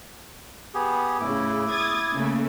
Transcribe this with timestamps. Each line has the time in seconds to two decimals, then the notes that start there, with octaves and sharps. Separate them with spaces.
0.74 B3 G4 G#4
1.20 A2 C#3 E4 D6
1.69 D#6 G#6 A6
2.12 C#3 A3 A#3